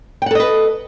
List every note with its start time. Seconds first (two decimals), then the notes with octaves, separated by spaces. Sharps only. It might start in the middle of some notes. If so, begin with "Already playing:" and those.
0.22 G5
0.26 F#5
0.31 A4
0.35 D#5
0.40 B4